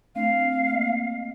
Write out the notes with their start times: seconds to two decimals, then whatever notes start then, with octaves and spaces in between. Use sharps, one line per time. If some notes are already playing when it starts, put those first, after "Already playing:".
0.15 A3 C4 D4 F5
0.69 A#3 D#5